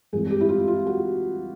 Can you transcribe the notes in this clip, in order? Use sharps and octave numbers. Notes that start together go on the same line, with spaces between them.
G2 E3 G#3 C4 E4 G#4
G4
E4
F4
F4
F#4